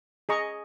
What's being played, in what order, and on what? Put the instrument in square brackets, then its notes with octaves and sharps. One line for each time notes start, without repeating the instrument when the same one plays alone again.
[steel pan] G#4 D#5 A#5 C#6